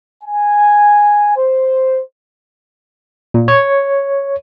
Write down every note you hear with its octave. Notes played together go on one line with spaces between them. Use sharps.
G#5
C5
A#2
C#5